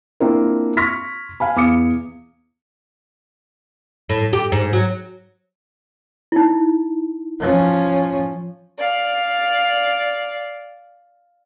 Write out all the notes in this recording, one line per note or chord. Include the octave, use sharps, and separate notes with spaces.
A#3 C4 D4 E4 F4 A#4
C6 C#6 F6 A#6 B6
F5 G#5 B5
E2 F5 D6 D#6 C#7
A2
G4
G#2
F#3
D#4 E4
F3 C#4
D5 F5